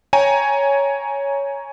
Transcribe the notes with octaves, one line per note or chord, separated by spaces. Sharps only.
C#5 G5 G#5 A#5